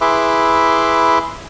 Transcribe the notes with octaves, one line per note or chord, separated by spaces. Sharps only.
E4 G#4 B4 E5 C6 D6